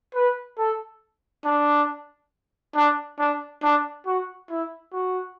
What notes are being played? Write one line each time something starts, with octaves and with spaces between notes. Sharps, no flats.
B4
A4
D4
D4
D4
D4
F#4
E4
F#4